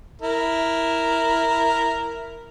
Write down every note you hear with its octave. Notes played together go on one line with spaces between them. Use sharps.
E4 A#4